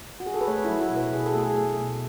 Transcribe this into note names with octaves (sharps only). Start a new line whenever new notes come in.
F#4
G#4
A4
B4
A3 C#5
F#3 E4
F#4
B2
B4
B2 G#4
A4
A3 G#4
A3
B2